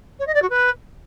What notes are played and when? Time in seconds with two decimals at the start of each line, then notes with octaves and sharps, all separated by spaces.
0.19 C#5
0.27 D#5
0.35 D5
0.42 F#4
0.50 B4